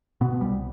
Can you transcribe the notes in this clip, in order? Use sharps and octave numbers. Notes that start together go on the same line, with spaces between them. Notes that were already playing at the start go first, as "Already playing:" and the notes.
B2 B3
C2 G3